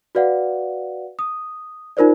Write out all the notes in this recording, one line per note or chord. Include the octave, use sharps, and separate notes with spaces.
F#4 B4 D5 F5 F#5
D#6
D#4 F4 A#4 C5 D5